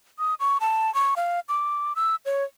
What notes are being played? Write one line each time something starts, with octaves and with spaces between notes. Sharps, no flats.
D#6
C#6
A5
C#6
F5
D6
E6
C#5